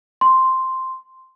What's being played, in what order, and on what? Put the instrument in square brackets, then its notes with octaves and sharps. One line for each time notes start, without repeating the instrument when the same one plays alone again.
[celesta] C6